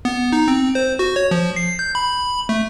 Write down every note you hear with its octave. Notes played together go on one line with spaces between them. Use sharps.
B3
D#4
C4
C5
F#4
C#5
F3
C7
G6
B5
A3